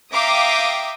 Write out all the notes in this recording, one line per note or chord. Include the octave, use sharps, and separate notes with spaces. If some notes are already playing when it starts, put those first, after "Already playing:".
E5 F5 G5 A#5 D6 D#6